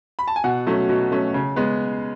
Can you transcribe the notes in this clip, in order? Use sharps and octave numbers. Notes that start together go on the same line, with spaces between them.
B5
A5
G#5
B2 F#5
F#3 A3 C#4
B2
F#3 A3 C#4
C#3
G#3 B3